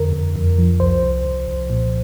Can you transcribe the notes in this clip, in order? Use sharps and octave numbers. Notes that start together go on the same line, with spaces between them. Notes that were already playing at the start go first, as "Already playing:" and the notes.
Already playing: F2 D3 A#4
F2
F2
F3
C2 C5
C2
C2
C2
A#2